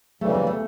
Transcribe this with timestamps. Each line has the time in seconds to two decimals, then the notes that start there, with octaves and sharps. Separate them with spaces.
0.21 D2 C#3 E3 G3 A3
0.34 A#3
0.47 A3